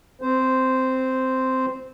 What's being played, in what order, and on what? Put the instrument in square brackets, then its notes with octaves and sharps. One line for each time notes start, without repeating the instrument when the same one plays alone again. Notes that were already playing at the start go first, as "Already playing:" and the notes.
[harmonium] C4 C5